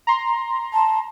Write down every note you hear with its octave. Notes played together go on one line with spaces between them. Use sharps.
A#5 C6
A5